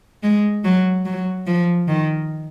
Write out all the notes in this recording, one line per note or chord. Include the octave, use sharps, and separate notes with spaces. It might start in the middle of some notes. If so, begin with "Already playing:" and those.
G#3
F#3
F#3
F3
D#3